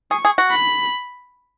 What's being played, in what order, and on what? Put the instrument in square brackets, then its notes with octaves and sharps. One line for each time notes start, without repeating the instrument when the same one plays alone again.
[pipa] G#4 [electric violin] C#6
[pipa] G#4
F#4
[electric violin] B5